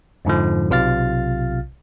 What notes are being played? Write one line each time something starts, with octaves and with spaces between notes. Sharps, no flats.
F2 G#2 D3 F3
B1 C3 F4 F5 F6 A6